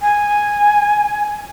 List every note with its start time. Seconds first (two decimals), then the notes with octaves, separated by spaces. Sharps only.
0.01 G#5